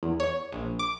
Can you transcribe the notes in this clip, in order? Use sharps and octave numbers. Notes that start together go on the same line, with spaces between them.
E2
C#5
A#1
D6